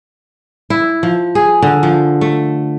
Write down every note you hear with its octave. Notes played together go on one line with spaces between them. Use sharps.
E4
F3
G#4
D3
F3
A3